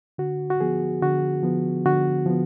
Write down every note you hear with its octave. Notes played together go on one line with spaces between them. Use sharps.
D3 F#4
F#4
F3 B3 G#4
D3 F#4
F3 B3
D3 F#4
F3 B3